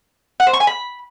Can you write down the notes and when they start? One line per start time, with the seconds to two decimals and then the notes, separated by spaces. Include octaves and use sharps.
0.40 F#5
0.47 C5
0.53 C#6
0.60 G#5
0.67 B5